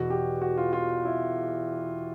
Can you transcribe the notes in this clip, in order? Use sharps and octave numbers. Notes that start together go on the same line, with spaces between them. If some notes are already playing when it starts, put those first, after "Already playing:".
Already playing: E2 B2 F#4
G4
F#4
F4
F4
E4